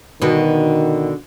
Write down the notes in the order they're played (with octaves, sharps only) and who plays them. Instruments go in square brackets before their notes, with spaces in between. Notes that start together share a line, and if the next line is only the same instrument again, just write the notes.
[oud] B2 D3 [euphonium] D#3